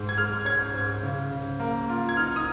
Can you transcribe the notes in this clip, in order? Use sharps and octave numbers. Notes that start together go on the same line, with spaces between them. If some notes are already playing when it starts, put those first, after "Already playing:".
Already playing: G#2 G#3
G#6
G#3 F6
C#4 G#6
G#2
C#3
C#3
A#3
F4
G#6
D#4 F6
D#6